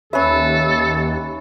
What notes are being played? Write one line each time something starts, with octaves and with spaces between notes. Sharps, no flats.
D#2 C#4 A4 B4 E5